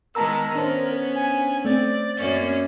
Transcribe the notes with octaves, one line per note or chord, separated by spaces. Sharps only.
D#3 G#3 B3 A#4 A5 A#5 E6
B3 C#4 D4 C5
G#5
A3 C4 D5
F#2 A#3 C#4